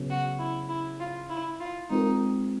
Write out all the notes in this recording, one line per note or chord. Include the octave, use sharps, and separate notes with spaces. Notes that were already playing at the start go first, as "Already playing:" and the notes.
Already playing: C#3 F#3 B3
F#4
E4
E4
F4
E4
F4
G#3 C4 D#4 F4 A#4